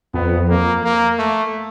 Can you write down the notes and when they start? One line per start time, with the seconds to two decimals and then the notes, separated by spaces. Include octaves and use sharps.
0.14 F2 B3
0.49 A#3
0.85 A#3
1.19 A3